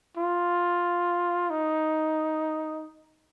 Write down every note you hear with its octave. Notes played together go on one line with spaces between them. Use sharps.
F4
D#4